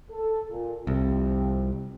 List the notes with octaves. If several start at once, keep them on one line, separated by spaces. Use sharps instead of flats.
A4
A#2
C2 F2 C4 G4